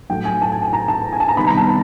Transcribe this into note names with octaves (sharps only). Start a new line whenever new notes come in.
A2 F#3 A3 G5
G#5
A5
G#5
A5
A#5
A5
G#5
A5
A#5
C3 D#3 G3 B3 B5
A#5
A5